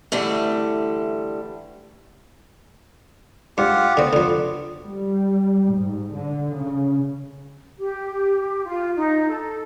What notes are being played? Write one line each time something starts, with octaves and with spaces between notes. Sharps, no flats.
D3 E3 G3 A3
G2 F4 G4 F#5
D3 B3 C4
F2 D3
G3
G#2
D3
C#3
G4
F4
D#4
A4